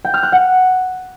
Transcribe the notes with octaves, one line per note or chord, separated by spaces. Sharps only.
G5
F6
F#6
F#5